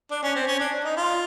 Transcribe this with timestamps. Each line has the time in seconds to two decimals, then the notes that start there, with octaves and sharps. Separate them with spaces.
0.11 D4
0.23 C#4
0.35 C4
0.47 C#4
0.60 D4
0.85 D#4
0.97 F4